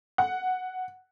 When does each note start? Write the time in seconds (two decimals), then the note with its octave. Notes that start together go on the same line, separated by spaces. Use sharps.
0.18 F#5